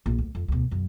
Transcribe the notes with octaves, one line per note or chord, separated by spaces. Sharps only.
A#1 D3
D2
F2
D2 B2
F#2 C#3